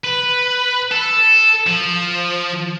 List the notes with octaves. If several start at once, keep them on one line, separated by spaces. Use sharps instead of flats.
B4
A4
F3